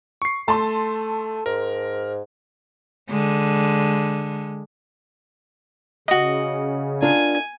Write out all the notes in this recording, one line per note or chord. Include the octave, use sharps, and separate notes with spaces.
C#6 C7
A3 A4 A5 C6
G#2 A#4
D3 G#3
C#3 F#4 D#5
D4 F4 A#4 G#5